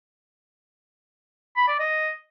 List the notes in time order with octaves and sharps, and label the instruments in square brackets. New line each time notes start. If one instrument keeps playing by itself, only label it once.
[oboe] B5
D5
D#5